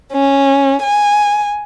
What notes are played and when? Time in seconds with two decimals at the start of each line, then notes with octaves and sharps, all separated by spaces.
0.13 C#4
0.83 G#5